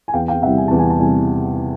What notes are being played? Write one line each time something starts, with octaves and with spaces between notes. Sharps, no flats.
G#5
E2 F5 G5
F5 G5
C3 E3 G3 E5 F#5
G#5
E2 A5
G#5
A5
C3 E3 G3 G#5